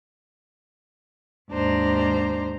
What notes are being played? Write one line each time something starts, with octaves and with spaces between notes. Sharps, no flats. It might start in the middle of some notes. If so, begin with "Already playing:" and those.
D#2 G#2 D4 C5 A#5